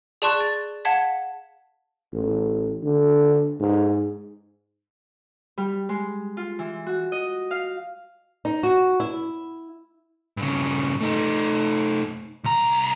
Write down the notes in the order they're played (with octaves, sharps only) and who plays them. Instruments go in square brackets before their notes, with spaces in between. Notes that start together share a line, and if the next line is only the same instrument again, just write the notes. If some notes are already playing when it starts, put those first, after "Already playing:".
[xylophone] G#4 D5 A5 C6 C#6 F#6
A6
F5 F#5 A5 G#6 B6
[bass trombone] A1
D3
G#2
[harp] G3
G#3
F4
E3
F#4
D#5
F5
[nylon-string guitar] D#4
F#4
E4
[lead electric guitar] G2 C#3
A3 D#4
C2 A#5